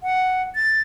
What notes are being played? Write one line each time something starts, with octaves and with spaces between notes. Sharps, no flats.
F#5
A6